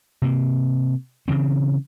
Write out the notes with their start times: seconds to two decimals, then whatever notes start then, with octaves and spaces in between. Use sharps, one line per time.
0.22 C3 A#3
1.28 C#3 E3 C4